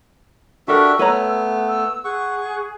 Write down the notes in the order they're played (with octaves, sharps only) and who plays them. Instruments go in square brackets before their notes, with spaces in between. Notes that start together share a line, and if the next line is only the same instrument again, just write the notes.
[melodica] D4 F#4 E5 [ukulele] G4 A4 A#4 [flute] E6
[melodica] A3 B3 [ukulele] B4 C#5 A#5
[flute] E6
[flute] G#4 [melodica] F#5 C#6